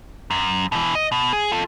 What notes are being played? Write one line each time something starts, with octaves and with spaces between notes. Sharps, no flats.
F#2
B2 E3
D#5
B2
G#4
F4 A4